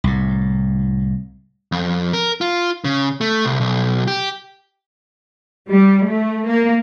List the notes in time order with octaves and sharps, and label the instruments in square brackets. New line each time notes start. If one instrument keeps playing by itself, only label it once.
[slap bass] C2 A2
[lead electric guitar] F2
A#4
F4
C#3
A3
C2
B1
G4
[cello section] G3
A3
A#3